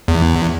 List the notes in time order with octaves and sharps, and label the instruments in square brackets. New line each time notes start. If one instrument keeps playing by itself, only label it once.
[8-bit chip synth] E2